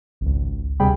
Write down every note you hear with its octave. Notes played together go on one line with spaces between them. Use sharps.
G#1 C#2
D2 C3 G3 G#4 G5 B5